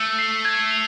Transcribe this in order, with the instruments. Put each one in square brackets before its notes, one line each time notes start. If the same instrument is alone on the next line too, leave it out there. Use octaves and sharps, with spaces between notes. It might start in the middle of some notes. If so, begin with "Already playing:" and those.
Already playing: [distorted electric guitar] A3 [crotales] E6
[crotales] C7
G#6
F7